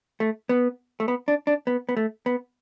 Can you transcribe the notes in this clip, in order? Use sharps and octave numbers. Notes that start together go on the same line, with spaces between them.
A3
B3
A3
B3
D4
D4
B3
B3
A3
B3